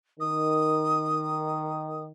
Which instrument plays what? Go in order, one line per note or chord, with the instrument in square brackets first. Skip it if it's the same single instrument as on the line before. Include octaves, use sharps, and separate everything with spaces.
[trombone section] D#3 [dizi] D#6